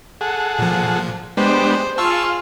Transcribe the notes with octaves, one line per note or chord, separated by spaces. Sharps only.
G#4 A4 F#5
A#2 F3
G#3 B3 D4 G4 C5
F4 G#4 F5 A5 C#6 E6